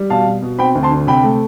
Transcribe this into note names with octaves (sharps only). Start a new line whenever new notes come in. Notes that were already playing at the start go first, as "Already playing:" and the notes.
Already playing: G3
B2 F5 A5
B2
B2
C4 G5 B5
D2
A5 C6
D3
C3 G5 B5
A3